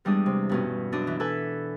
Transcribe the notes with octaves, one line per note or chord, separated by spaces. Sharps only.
E2 G3 G#3 D4 D#6
C3
G2 B2 C#4
F#2 D4 D#5
E3
E3 A4 B4 G#5